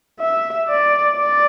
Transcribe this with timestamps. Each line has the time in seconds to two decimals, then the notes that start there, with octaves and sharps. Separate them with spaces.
0.20 E5
0.69 D5
1.16 D5